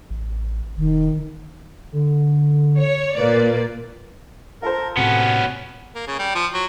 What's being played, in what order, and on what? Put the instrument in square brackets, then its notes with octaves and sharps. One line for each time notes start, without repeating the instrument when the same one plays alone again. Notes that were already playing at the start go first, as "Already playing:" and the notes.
[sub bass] A1
[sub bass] E1 [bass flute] D#3
[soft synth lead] D3
[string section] C#5
[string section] A#2 A#3 D5 [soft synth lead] B4
[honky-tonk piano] F4 A4 C5 [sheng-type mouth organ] A#4
[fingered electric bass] A2 C3 [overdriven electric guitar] B3 C#4 [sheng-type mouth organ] F#4
[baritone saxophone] A#3
C#3
G3
F3
F#3